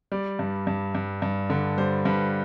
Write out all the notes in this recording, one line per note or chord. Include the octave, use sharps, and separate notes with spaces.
G3 D5
G2
G2
G2
G2
D3
G3 C5
G2 B4